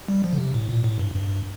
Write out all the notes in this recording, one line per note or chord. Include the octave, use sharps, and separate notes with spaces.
G3
F3
D3
C3
A2
A#2
A2
G2
G2